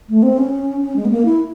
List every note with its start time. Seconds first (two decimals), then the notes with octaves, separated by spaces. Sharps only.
0.09 A3
0.23 C4
0.38 C#4
0.81 C#4
0.96 G#3
1.05 B3
1.11 A#3
1.25 E4